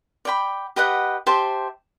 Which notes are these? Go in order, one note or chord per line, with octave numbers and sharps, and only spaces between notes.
D5 G5 B5
G4 B4 D#5 F#5
G4 C5 E5 A5